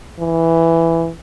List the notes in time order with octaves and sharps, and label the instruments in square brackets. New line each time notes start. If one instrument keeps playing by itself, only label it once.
[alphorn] E3